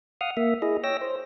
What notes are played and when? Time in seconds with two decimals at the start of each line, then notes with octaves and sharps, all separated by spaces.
0.21 F5 F#5 D#6 F6
0.37 A#3 E5
0.62 E4 G#4 D#5
0.84 C#5 G5 E6 A#6
1.01 C5